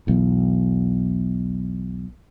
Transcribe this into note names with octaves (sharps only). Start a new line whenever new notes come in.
B1 E2